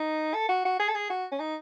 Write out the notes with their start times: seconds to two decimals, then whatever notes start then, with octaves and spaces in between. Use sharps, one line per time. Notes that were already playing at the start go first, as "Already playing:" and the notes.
Already playing: D#4
0.34 A4
0.49 F#4
0.65 F#4
0.79 G#4
0.88 A4
0.95 G#4
1.10 F#4
1.31 C#4
1.39 D#4